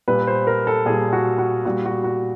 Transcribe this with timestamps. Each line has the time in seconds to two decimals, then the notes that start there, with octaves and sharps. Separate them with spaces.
0.08 A#2 G3 B4
0.27 C5
0.47 A#4
0.67 A4
0.86 A#2 G3 G#4
1.13 F#4
1.38 F#4
1.65 A#2 G3 F#4
1.86 F#4
2.04 F#4